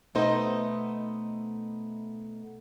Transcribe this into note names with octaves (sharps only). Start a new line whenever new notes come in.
B2 A3 B3 D#4 C5 D#5